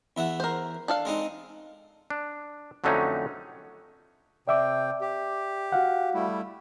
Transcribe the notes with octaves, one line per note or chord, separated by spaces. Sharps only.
E2 E5 F#5
A#4 C5
D4 A4 F5
G#3 C4 D#4
D4
F2 D3 F#3 A3 C#4 D#4
C3 D5 E5 G5 D6
G4
F#4 F5 F#5
G3 A3 E4